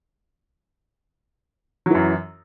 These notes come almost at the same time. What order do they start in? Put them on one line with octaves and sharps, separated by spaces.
F#3 E3 F#2